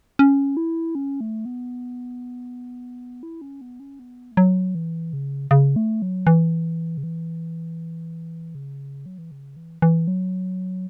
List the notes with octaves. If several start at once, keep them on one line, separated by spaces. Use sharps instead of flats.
C#4
E4
C#4
A3
B3
E4
C#4
B3
C#4
B3
A3
F#3
E3
C#3
C#3
A3
F#3
E3
C#3
E3
C#3
F#3
E3
C#3
E3
E3
F#3